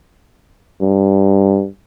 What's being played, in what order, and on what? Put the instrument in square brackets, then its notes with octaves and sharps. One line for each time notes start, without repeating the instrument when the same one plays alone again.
[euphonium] G2